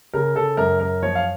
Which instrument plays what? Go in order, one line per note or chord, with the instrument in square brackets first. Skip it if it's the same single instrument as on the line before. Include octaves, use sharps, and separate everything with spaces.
[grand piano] C#3 A#4
C#3 A4
F#2 A#4
F#2 A#4
F3 C#5
F5